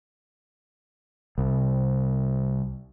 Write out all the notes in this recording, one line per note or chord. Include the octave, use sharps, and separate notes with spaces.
C2